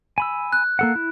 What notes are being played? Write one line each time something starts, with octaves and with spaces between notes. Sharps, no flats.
G#5 B5 E6
F#6
A#3 A4 F#5
E4